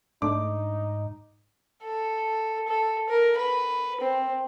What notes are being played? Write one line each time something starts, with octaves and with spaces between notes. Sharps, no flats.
G#2 A3 D4 D#4 D6
A4
A4
A#4
B4
C4